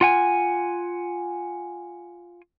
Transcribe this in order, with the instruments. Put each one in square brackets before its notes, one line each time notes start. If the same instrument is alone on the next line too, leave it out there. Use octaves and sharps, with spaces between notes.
[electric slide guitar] F4 F#5 G#5